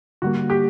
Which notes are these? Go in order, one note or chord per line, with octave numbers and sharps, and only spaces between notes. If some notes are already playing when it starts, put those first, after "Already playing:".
D3 G3 A#3 F#4
G4